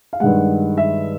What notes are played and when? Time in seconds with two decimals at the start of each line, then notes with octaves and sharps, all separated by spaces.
0.13 F5
0.20 G2 D#3 G#3 F#5
0.78 E5